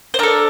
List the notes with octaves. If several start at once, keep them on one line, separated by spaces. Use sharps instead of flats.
C5
D4 A4 A#4